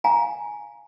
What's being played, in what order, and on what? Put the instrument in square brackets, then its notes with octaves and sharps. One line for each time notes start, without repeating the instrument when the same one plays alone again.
[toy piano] F5 G#5 A#5